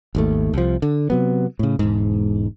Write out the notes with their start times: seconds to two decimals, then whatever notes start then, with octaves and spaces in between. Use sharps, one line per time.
0.15 G#1 D#2 A3
0.53 C2 F3
0.82 D3
1.10 C3 F#3 B3
1.59 A2 C#3
1.79 E1 G#2